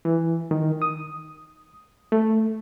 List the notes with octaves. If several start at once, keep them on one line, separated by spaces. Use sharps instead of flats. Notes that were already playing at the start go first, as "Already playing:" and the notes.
E3
D#3
D#6
A3